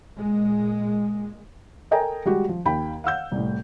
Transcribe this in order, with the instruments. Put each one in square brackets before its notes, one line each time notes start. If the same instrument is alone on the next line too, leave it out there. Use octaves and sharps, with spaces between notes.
[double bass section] A#2 G#3
[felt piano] A4 A#4 D#5 G5 G#5 A#5
G3 G#3 F#4 G4
F3
D#2 G5 B5
F5 F#5 E6 G6
C2 A2